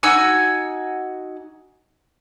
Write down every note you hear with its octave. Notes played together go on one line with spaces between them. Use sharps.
D#4 F#4 G#5 E6